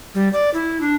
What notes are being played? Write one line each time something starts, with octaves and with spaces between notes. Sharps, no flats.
G3
D5
E4
D4